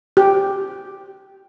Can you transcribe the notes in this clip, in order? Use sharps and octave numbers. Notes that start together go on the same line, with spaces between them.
G4